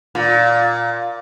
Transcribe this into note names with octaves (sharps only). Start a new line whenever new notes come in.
A#2